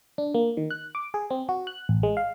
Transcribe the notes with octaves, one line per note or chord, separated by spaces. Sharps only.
D4
A#3
D#3
F#6
D6
G#4
C4
F#4
F#6
A1
G#3
F5